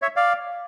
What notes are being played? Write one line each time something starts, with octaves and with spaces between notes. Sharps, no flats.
C#5 E5
D5 F5